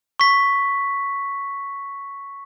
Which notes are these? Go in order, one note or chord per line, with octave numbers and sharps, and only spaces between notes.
C#6 B6